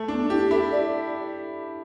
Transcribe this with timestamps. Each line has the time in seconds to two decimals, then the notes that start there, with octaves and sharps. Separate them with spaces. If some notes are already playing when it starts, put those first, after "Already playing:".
Already playing: A3
0.08 D4
0.13 B3
0.23 D4
0.30 E4 G4
0.41 G4
0.51 E4 A4
0.72 D5